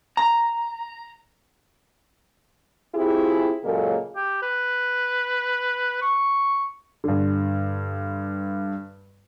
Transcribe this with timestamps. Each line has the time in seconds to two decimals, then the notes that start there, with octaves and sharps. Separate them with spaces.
0.17 A#5
2.94 C4 E4 F4 G4 G#4
3.64 A#2 C#3 F#3 G#3 A#3 A4
4.16 G4
4.42 B4
6.02 C#6
7.04 G2 D3